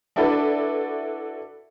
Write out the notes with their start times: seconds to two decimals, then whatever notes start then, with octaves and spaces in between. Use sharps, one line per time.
0.16 D4 E4 F#4 A4 B4 D5